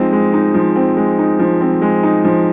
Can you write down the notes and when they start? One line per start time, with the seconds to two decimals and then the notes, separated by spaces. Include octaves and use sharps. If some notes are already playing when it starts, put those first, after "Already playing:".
Already playing: F3 G#3 C4 D#4
0.13 G#3
0.33 D#4
0.54 F3
0.76 C4
0.97 G#3
1.19 D#4
1.39 F3
1.61 C4
1.82 G#3
2.03 D#4
2.24 F3